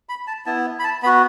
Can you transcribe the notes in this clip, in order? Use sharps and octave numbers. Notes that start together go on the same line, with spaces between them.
B5
A5
B3 E4 A5
B5
A5
B3 F#4 B5